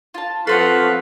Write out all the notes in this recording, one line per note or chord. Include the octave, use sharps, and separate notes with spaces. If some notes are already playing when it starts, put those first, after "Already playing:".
F4 A5
F3 C4 A4 B4 C5 F5 F#5 C#6